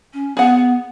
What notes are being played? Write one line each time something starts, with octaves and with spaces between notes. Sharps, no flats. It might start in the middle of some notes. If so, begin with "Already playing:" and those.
C#4
B3 G#4 F#5